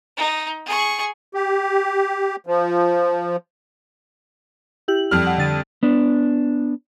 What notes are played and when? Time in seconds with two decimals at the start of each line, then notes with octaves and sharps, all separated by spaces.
0.17 D#4
0.66 G#4 C#6
1.34 G4
2.47 F3
4.88 E4 G4 F#7
5.11 F2 G3 F6
5.27 F#5
5.38 D3 A6 D#7
5.83 B3 D4